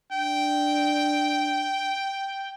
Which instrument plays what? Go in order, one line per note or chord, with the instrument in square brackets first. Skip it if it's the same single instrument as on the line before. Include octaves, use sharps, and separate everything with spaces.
[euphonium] D4 [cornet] G5